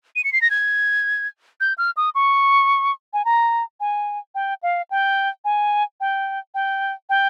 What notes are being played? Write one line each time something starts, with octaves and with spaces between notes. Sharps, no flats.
D#7
C#7
C7
A#6
G#6
G6
F6
D#6
C#6
G#5
A#5
G#5
G5
F5
G5
G#5
G5
G5
G5